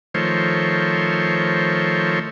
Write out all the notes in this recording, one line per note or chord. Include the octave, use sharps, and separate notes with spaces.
D#3 F3 A3 C5 C#5